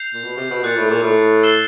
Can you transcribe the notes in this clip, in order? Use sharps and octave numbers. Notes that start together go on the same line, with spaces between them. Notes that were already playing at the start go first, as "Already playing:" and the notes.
Already playing: G6 C7 F7
A#2
B2
C3
B2
A#2 D#6 F#6 A6 C#7
A2
A#2
A2
E6 A6 C7 E7 G7